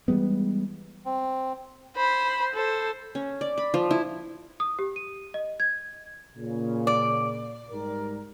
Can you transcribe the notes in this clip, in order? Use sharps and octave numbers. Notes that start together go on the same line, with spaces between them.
E3 G3 G#3 B3
C4
C5 B5
A4 C5
C#4
D5
B5
F3
E4
D#6
G4
D#7
D#5
G#6
A#2 C#3
D5
G#2 G3 A#4